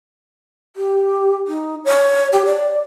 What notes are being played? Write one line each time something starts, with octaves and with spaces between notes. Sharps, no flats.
G4
D#4
C#5
G4
D5